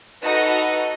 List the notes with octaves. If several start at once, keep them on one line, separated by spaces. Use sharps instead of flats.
D#4 F#4 A4 B4 D#5